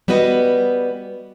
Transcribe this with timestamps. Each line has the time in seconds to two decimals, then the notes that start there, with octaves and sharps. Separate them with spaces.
0.08 G3 B3 F#4 B4 D#5